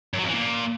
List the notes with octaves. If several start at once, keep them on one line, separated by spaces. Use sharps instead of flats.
F#2
F#3
F2
E3
A#2